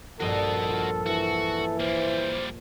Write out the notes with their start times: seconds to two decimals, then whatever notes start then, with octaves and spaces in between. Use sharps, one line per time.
0.20 A#1 G2 F#4 A4 D#5
0.70 F4
1.06 E3 F#4
1.80 G3 A#3 C5